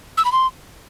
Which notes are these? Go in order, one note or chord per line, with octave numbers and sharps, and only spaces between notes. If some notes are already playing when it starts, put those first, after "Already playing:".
E6
B5
C6